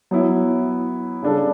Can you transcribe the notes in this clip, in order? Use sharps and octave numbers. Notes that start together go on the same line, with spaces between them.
F#3 B3 E4
C#3 G3 D4 A4